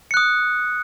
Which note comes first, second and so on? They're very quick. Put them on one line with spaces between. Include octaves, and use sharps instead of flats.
C#7 F#6 D#6